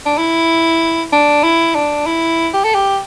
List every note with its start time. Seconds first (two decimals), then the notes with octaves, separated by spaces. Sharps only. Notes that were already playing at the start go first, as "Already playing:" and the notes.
0.06 D4
0.18 E4
1.13 D4
1.44 E4
1.75 D4
2.06 E4
2.54 G4
2.64 A4
2.75 G4